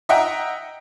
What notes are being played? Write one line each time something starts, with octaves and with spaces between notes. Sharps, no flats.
D#5 E5 F#5 G5 A#5